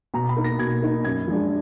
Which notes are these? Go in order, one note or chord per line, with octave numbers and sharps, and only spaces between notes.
B2 A#5
B5
A#3 D#4
A#6
B2 G#6
A#3 D#4
F#2 G#6
F3 G#3 D4